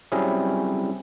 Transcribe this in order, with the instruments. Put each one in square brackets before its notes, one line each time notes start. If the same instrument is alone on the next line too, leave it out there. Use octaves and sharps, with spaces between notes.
[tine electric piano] F#3 G3 C4 C#4 E4 G#4